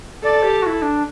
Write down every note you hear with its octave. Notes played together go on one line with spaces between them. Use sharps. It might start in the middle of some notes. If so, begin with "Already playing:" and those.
A4 D5
G4
F#4
E4
D4